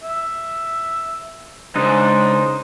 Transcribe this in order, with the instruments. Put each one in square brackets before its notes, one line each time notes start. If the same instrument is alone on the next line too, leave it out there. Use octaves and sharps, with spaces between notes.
[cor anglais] E5
[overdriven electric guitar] C#2 G2 [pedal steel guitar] C#3 D4 D#4 [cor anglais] C5